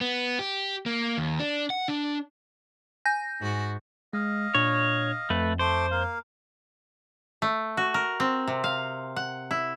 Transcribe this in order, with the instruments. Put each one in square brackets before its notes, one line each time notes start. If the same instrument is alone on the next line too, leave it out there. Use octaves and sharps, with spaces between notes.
[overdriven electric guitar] B3
G4
A#3
D#2
D4
F#5
D4
[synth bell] G#5 G6 A#6
[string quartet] G#2 F#4
[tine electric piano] G#3 [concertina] D#5 F5
[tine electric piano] A#2 D4 [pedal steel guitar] C#5
[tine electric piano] F2 [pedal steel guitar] A3 B4
[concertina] A3 C6 D6 [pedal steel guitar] C5
[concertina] A#3 F5
[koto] A3
F#4
A#4
C4
C3
F5
F#5
E4